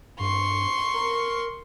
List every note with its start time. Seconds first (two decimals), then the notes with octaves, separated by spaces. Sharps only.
0.20 G2 C6 C#6
0.94 A#4